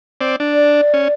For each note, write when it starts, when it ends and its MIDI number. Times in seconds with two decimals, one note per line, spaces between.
0.21 0.36 60
0.21 0.36 74
0.40 0.81 62
0.54 1.14 74
0.94 1.08 61